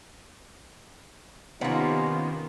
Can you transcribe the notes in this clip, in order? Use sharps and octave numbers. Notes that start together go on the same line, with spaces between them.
C3 D#3 A#3 B3 C#4 D#4 F4